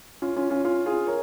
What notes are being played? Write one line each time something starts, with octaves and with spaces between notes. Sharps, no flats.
C#4 F4
C#4 F4
C#4 F4
C#4 F4
F4 G#4
A#4 C#5